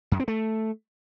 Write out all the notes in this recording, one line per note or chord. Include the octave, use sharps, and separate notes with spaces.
F#2
C4
A3